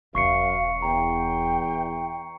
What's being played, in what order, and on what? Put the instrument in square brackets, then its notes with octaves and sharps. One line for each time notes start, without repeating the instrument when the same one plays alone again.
[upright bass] E1 [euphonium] F#2 [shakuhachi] F5 [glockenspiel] C#6 C7 C#7
[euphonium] E2 [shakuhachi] G5 [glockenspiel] A#5